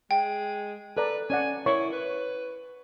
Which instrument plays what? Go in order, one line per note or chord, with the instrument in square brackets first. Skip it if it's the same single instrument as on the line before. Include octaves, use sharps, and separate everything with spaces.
[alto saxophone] G#3 [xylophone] G5
[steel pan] A4 D5 A#5 [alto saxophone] B4
[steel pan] C#4 D5 F#5 [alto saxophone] G#5
[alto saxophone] E4 [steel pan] A#4 C#5 C#6
[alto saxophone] B4